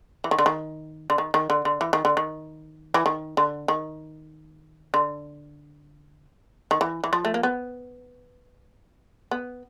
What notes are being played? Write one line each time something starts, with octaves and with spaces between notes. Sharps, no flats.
E3
D#3
D3
D#3
D3
D#3
D#3
D3
D3
E3
D#3
D3
D#3
E3
D#3
D3
D#3
D3
D#3
E3
E3
F3
A3
A#3
B3
B3